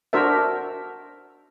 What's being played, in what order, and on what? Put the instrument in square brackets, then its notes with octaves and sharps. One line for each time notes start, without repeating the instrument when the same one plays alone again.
[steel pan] D4 F#4 A#4 C5 E5